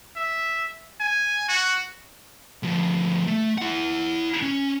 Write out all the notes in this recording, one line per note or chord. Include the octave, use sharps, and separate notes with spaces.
E5
G#5
F#4
D2 F3
A3
E4 F#5
C#4